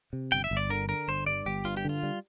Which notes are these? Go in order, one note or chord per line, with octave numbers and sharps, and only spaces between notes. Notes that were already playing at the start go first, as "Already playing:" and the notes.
C3
G1 G5
E5
G1
D5
D3 A#4
D3 A#4
G1 C5
G2 D5
G1 G4
G2 F4
G4
D3 F4
G3